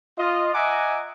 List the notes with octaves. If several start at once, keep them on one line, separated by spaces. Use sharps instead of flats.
F4 D#5
D#5 E5 F#5 G#5 A#5 D6